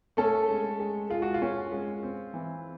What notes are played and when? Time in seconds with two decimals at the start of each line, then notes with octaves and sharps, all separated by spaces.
0.17 A3 C#4 A4
0.48 G#3
0.80 G#3
1.10 G#3 F4
1.22 F#4
1.34 F4
1.42 C#4
1.72 G#3
2.03 C4
2.34 E3